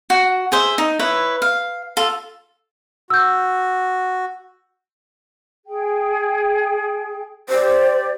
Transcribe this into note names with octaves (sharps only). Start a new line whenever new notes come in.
F#4
G#4 C5 E5
D#4
E4 B4 C#5 B5
F5
F4 A4
F#4 E6 G6
G#4 G5
G4 C5 D5